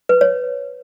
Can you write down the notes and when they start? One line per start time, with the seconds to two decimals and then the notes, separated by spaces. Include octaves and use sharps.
0.09 B4
0.21 C#5